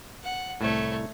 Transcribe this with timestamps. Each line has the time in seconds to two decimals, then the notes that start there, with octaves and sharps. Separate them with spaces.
0.24 F#5
0.61 C2 A2 A3 C#5